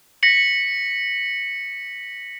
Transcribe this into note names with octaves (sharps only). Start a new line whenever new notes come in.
A#6 B6 C#7 F#7